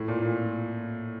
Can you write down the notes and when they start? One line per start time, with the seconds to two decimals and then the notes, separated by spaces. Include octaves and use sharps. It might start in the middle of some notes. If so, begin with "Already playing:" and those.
Already playing: A2
0.08 A#2
0.22 A#2